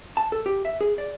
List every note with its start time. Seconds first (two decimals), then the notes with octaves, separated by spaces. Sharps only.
0.17 A5
0.32 A4
0.46 G4
0.65 E5
0.81 G#4
0.98 D5